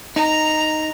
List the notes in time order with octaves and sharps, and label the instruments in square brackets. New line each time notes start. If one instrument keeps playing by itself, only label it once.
[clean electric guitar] D#4 [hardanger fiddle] A#5